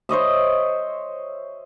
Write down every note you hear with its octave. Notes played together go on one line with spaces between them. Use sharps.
C5 C#5 D#5 E5